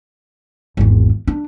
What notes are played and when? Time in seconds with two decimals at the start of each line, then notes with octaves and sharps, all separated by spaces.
0.77 G#1 E2
1.28 D4